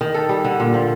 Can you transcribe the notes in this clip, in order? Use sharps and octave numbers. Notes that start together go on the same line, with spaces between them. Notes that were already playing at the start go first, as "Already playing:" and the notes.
D#3
A4
G3
D3
A#2
F3